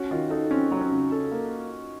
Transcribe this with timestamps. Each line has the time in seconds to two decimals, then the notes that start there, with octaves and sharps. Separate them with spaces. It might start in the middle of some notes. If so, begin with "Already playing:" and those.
Already playing: C#4 F#4
0.11 D#3 F4
0.30 D#4 A4
0.51 C4 C#4
0.71 F#3
0.81 C#4
0.91 C#3
1.11 A4
1.32 A#3